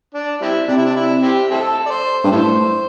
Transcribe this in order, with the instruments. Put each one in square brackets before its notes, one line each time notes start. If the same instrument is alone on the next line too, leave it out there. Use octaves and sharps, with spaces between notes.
[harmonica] D4
G3 C4 E4
[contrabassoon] C3 [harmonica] D4
[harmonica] E4
D4
E4
C4 E4 G4
C4 E4 A4
D5
C5
[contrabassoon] G2
[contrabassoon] A2 [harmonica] E4 A4 C5